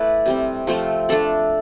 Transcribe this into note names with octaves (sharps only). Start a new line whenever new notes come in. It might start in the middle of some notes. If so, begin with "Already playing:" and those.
Already playing: A3 E4 B4 D5
C3 G3 C4
F3 A3 C4 F4
A3 D4 A4 D5